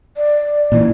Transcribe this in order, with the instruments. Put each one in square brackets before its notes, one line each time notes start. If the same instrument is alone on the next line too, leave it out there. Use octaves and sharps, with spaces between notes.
[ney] D5
[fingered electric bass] A#2 E3